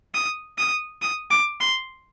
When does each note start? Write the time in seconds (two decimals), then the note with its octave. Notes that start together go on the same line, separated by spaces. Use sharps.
0.14 D#6
0.58 D#6
1.02 D#6
1.31 D6
1.60 C6